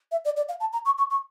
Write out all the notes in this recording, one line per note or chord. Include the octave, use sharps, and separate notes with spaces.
E5
D5
D5
F5
A5
A#5
C#6
C#6
C#6